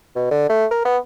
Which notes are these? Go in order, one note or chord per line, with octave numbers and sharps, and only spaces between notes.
B2
D3
A3
A#4
B3